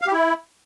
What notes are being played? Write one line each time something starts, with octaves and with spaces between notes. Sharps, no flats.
F5
G4
E4